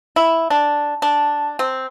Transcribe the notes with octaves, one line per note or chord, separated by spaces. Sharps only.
E4
D4
D4
C4